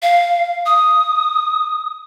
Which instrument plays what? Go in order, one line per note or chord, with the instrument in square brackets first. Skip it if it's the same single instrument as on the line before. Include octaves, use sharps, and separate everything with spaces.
[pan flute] F5
D#6